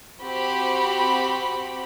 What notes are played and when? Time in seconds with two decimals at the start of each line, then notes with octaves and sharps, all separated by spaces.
0.21 C4 F#4 G4 B5